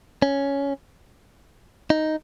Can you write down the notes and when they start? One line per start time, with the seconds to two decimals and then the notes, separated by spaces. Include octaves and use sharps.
0.22 C#4
1.90 D#4